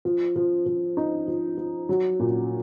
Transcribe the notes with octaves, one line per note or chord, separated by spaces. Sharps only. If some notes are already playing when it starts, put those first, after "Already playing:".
F3
F3
F3
D#4
F3
F3
F#3
A#2